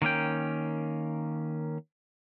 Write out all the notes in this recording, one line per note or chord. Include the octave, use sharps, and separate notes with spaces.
D#3 A#3 C#4 G5